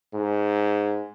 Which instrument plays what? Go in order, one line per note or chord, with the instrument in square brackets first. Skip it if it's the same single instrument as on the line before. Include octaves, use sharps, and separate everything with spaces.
[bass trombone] G#2